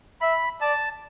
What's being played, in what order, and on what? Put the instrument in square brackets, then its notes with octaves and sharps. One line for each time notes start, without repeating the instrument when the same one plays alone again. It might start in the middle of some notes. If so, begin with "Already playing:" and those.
[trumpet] E5 [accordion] B5
[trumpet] D5 [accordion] A5